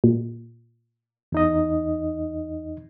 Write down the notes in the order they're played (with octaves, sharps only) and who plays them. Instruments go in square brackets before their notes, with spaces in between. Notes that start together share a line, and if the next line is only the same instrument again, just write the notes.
[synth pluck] A#2
[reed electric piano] E2 D#4 D#5